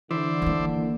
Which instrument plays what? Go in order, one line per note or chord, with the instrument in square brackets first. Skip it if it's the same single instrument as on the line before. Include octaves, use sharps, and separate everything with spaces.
[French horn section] D3 [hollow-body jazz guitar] E3 [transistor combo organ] C5 D5 E5
[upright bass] D#3 A#3